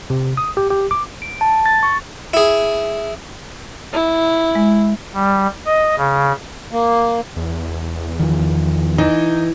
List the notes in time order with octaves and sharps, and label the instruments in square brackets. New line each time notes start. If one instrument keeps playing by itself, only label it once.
[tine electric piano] C3
D#6
G4
G4
D6
[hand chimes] D7
A5
A6
C#6
[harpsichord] E4 G#4
[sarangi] E4
[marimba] G#3
[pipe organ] G3
D#5
C#3
[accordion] A#3
[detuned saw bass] E2
[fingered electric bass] D#3 F3
[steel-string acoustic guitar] E3 [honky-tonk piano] D#4